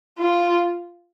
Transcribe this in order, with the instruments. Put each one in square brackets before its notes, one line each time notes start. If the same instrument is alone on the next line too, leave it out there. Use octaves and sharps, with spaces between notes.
[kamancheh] F4